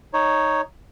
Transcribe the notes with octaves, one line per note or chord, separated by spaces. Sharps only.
D#4 C#5